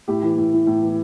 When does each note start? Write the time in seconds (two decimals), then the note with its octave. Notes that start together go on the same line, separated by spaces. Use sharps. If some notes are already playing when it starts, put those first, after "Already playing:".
0.08 A2 G4
0.23 E3
0.37 A2
0.53 E3
0.67 A2
0.82 E3